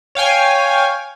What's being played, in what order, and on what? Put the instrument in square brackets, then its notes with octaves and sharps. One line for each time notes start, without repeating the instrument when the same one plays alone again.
[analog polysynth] C#5 F5 G5 G#5